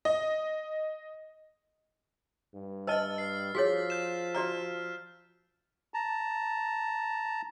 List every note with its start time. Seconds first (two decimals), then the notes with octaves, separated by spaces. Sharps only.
0.05 D#5
2.55 G2
2.87 B4 D#5 A5 E6 F6 A6
3.18 C7
3.55 F3 F#4 G#4 C#5 A6 B6
3.90 G6 E7
4.35 F#4 D5 A#5 F6
5.94 A5 A#5